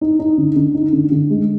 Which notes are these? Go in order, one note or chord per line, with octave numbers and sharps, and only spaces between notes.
D#4
D#4
D3
D3
D#4
D3
D3
G#3